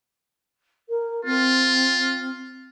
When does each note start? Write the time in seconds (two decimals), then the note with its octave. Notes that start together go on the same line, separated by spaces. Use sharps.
0.89 A#4
1.25 C4 F4